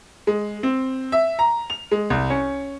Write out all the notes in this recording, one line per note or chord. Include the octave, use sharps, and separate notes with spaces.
G#3
C4
E5
A#5
F7
G#3
C2
C#4